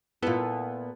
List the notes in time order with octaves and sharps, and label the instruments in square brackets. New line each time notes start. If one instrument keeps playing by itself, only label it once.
[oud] A#2 A4 [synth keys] B3 [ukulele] E4 F4